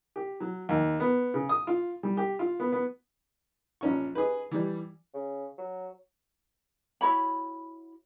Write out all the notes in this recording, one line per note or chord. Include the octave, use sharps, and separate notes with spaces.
G4
F#3
D#2
B3
C#3
D#6
F4
G3
G4
F4
B3
B3
A#1 C#4 C#6
G#4 B4
E3 G3
C#3
F#3
E4 F#4 C#5 B5